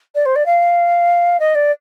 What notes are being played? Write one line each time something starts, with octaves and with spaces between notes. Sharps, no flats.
D5
C5
D5
F5
D#5
D5